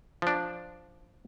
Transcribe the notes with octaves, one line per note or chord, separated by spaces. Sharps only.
F3 D4